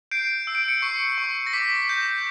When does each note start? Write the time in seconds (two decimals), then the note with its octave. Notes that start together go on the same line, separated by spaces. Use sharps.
0.11 G6 C7 D7
0.47 E6
0.55 D7
0.68 C#7
0.82 C#6 C7
1.18 C#6
1.47 A#6
1.53 D6 B6
1.89 G6